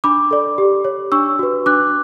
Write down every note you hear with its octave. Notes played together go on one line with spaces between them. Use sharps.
D4 B5 D6
A4 D5
G4
C#5
D4 C#6 E6
F#4 B4
D4 D6 F#6